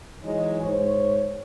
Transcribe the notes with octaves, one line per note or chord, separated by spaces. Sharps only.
E3 F#3 G#3 D#4 C#5
G#2 C5 C#5